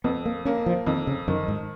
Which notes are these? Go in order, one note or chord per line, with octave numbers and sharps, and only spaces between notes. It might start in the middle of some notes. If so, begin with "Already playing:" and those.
F2 B3
A#3
A#3 C#4
F3
F2 D#3
C#3
F#2 D#3
G#2